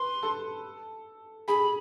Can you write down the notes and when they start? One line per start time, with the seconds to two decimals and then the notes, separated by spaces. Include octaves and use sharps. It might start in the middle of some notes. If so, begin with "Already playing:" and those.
Already playing: B4 C6
0.23 A4
1.48 G#4 B5